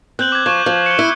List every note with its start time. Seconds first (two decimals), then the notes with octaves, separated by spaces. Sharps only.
0.19 C4 F#6 G6 F#7
0.32 D6 G#6
0.46 F3 C#6 G#6 E7
0.66 F3
0.86 C#7 G7
0.99 E4